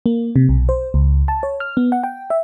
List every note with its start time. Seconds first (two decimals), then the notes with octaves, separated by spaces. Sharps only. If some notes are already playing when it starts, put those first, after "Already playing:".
0.06 A#3
0.36 C3
0.49 B1
0.69 C5
0.94 C#2
1.28 A5
1.43 C#5
1.60 F6
1.77 B3
1.92 F#5
2.04 G5
2.30 E5